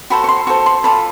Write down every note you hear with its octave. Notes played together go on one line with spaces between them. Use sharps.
F#4 A4 C5 B5
C#6
C6
F#4 A4 C5 C#6
C6
F4 A4 D5 B5